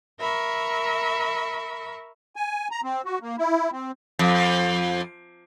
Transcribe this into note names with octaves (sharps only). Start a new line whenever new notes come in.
A#4 E5 B5 C#6
G#5
A#5
C4
F#4
A#3
E4
C4
F2